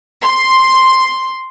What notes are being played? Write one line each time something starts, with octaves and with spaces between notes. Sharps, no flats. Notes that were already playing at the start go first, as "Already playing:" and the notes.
C6